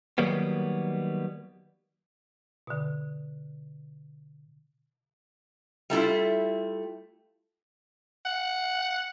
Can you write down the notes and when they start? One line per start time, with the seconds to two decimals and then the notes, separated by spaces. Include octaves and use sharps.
0.18 D#3 F#3 G3 A#3 B3
2.67 B2 D3
5.90 G3 A3 E4 F4
8.26 F#5